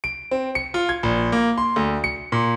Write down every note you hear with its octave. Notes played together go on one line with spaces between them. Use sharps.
D7
C4
C#7
F4
G#6
A#1
A#3
C6
D2
C#7
A#2